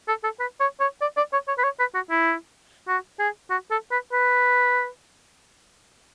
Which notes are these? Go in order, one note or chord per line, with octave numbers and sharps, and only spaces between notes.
A4
A4
B4
C#5
C#5
D5
D5
C#5
C#5
B4
C#5
B4
F#4
E4
F#4
G#4
F#4
A4
B4
B4